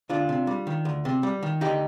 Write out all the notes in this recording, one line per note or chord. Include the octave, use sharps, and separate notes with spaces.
D2 D4 F4
C3
G3
D#3
D2
C3
G3
D#3
D2 D#4 G4